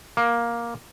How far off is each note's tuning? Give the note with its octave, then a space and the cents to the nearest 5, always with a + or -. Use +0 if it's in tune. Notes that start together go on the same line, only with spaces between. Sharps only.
A#3 +10